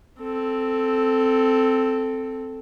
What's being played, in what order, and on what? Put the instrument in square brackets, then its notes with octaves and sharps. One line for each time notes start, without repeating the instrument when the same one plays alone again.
[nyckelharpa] C4 A4